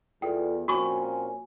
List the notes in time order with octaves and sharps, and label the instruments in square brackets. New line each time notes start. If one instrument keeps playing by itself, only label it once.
[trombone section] E2 [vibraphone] F4 A4 D5 [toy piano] G5
[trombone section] A#2 C4 C#4 [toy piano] F#4 C#6 [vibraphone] G#5